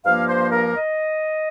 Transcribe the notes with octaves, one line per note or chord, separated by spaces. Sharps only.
G2 F3 A#3 F5
C5
A#4
D#5